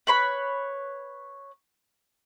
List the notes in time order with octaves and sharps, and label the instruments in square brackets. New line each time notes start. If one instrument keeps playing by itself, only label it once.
[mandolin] B4 C#5 B5